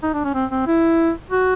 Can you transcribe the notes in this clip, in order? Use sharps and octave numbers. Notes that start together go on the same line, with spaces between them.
D#4
D4
C#4
C4
C4
E4
F#4